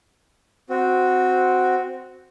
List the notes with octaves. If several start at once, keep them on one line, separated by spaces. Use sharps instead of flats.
C4 F#4